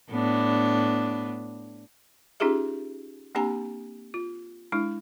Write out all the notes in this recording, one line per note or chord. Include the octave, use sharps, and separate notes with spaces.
A2 B3 D4
C#4 D#4 F4 G4 G#4 E5
A#3 C4 D4 G4 G#5 A#5
F4
G#3 D4 E4